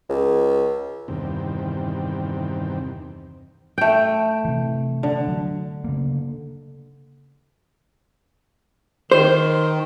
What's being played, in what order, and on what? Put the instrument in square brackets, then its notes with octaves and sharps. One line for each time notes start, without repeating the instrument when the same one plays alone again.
[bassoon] C#2
[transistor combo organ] E2 G2 C3 D#3 C4
[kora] A3 G5
[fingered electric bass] C3 E3
[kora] D3
[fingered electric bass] F#3
C#3 A#3
[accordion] D#3 [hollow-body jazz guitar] C5